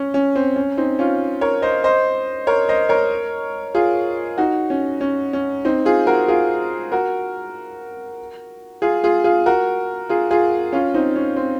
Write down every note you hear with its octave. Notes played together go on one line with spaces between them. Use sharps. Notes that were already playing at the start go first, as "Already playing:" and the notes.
Already playing: C#4
C#4
C4
C#4
C4 D#4
C#4 F4
A#4 C#5
C5 D#5
C5 D#5
A#4 C#5
C5 D#5
A#4 C#5
F4 G#4
D#4 F#4
C#4
C#4
C#4
C4 D#4
F4 G#4
F#4 A#4
F4 G#4
F#4 A#4
F4 G#4
F4 G#4
F4 G#4
F#4 A#4
F4 G#4
F4 G#4
C#4 F4
C4 D#4
C#4
C4